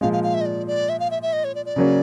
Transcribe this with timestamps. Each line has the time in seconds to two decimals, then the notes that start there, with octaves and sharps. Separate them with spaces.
0.01 A#2 F3 G#3 F5
0.13 F5
0.24 F5
0.34 E5
0.41 D#5
0.46 D5
0.67 D5
0.89 E5
1.00 F5
1.11 E5
1.22 E5
1.33 D#5
1.44 C#5
1.55 D5
1.66 D5
1.76 C#3 F#3 A#3 C#4